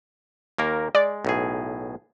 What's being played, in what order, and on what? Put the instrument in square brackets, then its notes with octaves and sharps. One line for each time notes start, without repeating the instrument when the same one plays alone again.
[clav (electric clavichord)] D#2 A#3 A#4
[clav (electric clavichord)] G#3 [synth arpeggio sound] D5
[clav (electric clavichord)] B1 A2 G#4